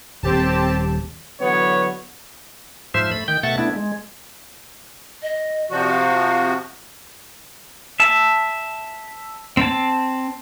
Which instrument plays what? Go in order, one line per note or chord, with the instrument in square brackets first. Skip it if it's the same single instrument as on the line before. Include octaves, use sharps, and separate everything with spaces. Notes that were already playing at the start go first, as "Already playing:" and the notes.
[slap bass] D#1 [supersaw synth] C4 G4 A5
[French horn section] D3 E3 F#3 [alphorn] B3 [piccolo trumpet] C#5
[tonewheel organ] G#2 F3 C5 E5
A3 B5
D#3 G5 G6
B2 A3 E5 F#5 C#6 A6
A3 B3 D4 E4
G#3
[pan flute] D#5
[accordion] C3 F3 F#4 [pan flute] D5
[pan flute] F5
[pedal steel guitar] E5 A5
C4 A5